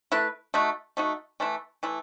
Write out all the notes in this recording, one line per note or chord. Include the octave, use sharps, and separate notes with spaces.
A3 E4 B4
A3 D#4 F#4
A3 D#4 F#4
E3 A3 E4
E3 A3 E4